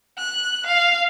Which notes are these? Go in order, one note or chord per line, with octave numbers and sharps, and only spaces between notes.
F#6
F5